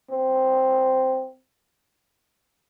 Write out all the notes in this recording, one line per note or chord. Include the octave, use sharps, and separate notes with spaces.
C4